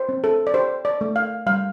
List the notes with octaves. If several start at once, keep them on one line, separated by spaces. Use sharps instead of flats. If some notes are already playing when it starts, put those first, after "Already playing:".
Already playing: C5
C4
A4
D5
G4 C5
D5
A3
F5
G3 F5